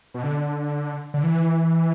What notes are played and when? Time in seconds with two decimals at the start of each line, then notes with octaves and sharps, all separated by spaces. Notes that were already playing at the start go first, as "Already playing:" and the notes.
0.14 B2
0.23 D3
1.14 D3
1.23 E3